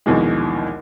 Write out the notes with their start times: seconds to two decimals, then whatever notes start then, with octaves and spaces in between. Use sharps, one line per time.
0.06 A#1 D#2 B2 E3 G#3